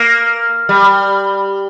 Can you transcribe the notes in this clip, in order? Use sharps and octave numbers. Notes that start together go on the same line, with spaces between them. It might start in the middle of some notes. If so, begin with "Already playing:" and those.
Already playing: A#3
G3